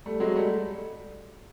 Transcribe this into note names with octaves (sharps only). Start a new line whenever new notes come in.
G3 A3
F#3 G#3
G3 A3